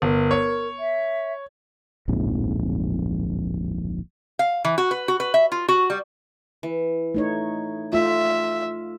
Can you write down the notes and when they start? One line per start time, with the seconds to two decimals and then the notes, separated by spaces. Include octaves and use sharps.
0.02 G1 A#4
0.31 C#5
0.79 E5
2.08 D1 A#1 F2 G#2
4.39 F5
4.65 E3
4.78 F#4
4.91 B4
5.08 F#4
5.20 B4
5.34 E5
5.52 F4
5.68 F#4
5.90 G3
6.63 E3
7.14 A3 D#4 C#5
7.93 A3 F4 E5